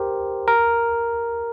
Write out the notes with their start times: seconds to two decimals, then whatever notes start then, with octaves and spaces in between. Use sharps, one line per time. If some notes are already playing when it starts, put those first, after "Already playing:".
Already playing: G4 A#4 C5
0.48 A#4